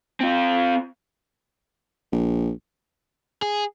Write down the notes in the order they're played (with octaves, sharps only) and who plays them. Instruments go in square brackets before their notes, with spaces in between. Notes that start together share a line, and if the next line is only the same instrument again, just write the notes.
[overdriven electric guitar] C4 F4
[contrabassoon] A#1
[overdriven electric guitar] G#4